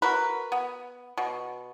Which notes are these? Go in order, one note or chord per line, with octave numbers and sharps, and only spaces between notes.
F#4 A#4 B4
B3
B2